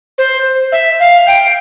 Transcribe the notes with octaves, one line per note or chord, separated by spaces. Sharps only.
C5
E5
F5
G5